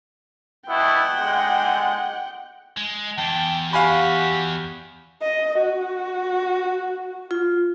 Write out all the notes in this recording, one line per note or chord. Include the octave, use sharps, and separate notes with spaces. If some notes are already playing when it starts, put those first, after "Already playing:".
B2 B3 E4 F#5 G5
D3 G#3
G#3
E2 G5 A5
F#4 G4 F5 G#5 B5
D#5
F#4
F4